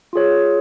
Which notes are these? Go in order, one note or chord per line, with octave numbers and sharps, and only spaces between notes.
F4 G#4 C#5